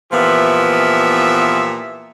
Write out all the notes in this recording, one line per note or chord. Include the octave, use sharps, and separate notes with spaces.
A#2 E3 F3 B3 G4 E5